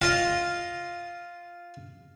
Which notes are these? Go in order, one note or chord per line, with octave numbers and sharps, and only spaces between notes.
F4 D#5